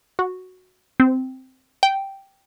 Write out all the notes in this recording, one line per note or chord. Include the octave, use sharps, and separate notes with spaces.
F#4
C4
G5